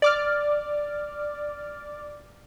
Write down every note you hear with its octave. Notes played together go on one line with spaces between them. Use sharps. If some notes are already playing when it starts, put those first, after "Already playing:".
D5 D6 F6